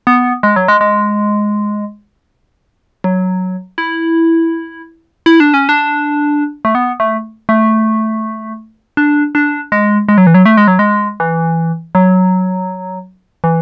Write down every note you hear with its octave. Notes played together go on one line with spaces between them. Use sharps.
B3
G#3
F#3
G#3
G#3
F#3
E4
E4
D4
C#4
D4
A3
B3
A3
A3
D4
D4
G#3
G#3
F#3
E3
F#3
A3
G#3
F#3
G#3
E3
F#3
E3